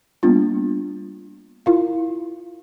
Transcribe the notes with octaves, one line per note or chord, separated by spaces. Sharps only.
G3 A#3 B3 D4 F4
E4 F4 A#4 F5